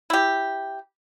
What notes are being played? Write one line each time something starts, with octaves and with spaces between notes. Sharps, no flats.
E4 G4